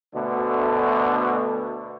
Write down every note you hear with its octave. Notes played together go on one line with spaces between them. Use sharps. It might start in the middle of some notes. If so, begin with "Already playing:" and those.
D2 B2 D3 A3